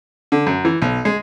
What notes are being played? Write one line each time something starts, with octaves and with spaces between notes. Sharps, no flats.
D3
F#2
E3
B1
G#3